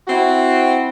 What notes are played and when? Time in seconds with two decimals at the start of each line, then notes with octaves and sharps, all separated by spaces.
0.07 C4 E4 F#4